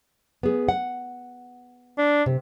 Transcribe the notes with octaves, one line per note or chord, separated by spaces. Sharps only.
B3 G#4
F#5
D4
C3